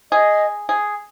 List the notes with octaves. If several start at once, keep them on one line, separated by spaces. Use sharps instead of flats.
G#4 D#5
G#4